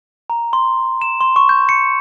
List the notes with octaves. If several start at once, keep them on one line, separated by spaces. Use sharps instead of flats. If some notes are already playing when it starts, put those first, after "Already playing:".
A#5
C6
E7
C6
C#6
G6
C#7